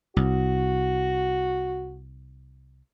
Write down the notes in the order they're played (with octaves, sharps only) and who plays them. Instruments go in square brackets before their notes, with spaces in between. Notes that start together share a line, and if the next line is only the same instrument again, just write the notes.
[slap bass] C2 [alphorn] F#4